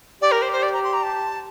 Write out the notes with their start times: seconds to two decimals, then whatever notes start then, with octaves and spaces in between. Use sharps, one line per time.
0.22 G4 D5
0.32 A#4
0.42 C5
0.52 C5
0.63 D5
0.73 A#5
0.83 C6
0.93 A#5
1.03 A5